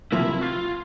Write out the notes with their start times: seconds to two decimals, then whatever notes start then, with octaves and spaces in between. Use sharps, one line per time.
0.12 C3 F3 A#3 E4
0.41 F4